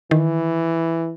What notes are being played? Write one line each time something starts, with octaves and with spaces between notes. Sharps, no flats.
D#3 E3